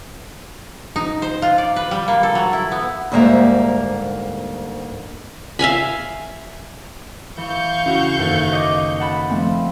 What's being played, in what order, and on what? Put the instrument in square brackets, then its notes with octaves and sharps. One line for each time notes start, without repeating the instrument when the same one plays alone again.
[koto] D#4
C5
F4
D5
B4
G3
A#3
A4
F#3
E4
B3
[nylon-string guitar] D2 G#2 G3 A#3 G4 E5
[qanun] E5 F5 G#5 B5
[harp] E3 [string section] F5 C#6 G6
[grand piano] C#3 E4 F#4
[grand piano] F#1 D#3 [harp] F#4 A4 E5
[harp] D#5 D6
F#5 A5 B5
F3 A3 C4